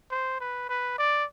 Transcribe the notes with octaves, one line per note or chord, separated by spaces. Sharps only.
C5
B4
B4
D5